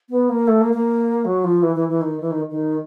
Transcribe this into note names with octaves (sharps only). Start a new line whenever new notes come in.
B3
A#3
A3
A#3
A#3
F#3
F3
E3
E3
E3
D#3
E3
D#3
D#3